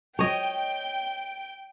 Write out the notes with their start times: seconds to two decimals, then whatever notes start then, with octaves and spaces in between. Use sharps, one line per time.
0.19 C#5 D#5 G5